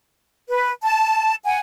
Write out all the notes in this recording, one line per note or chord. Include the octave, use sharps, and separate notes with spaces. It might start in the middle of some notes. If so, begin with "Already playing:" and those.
B4
A5
F#5 G#5